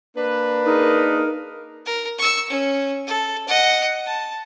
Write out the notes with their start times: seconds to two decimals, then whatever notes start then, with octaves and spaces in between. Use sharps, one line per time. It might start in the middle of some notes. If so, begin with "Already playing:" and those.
0.16 A#3 D4 B4
0.66 D#4 G#4 A#4
1.86 A#4
2.18 C#6 E6
2.50 C#4
3.07 A4
3.48 D#5 F#5
4.06 A5